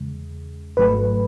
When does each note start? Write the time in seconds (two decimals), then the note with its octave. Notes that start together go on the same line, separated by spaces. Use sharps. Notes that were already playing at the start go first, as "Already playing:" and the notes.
Already playing: E2 C#3 G#3
0.77 G#1 G#2 F#3 A3 B4